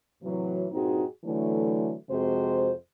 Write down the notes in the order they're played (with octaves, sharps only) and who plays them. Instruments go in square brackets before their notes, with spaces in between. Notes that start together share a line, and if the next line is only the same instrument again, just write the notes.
[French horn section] A2 C3 E3 F#3
G2 A#2 C4 D#4 F#4 G#4
D3 E3 F#3 A3
F2 C3 G#3 F#4 C5